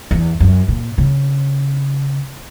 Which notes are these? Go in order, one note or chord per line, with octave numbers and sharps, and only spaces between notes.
E2
F#2
A#2
C#3